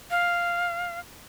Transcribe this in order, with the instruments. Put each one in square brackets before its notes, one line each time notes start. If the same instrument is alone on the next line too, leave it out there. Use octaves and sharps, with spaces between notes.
[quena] F5